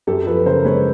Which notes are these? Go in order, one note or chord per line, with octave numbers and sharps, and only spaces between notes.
F#2 G4 A4
F3 A4 B4
C#3 A#4 C5
G#3 B4 C#5